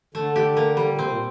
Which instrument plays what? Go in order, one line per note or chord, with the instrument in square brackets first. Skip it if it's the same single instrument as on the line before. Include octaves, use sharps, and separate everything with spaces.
[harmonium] D3 [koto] A3
[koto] G4
A#3
G3
[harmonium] A#2
[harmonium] C3 [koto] C4
[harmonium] A#2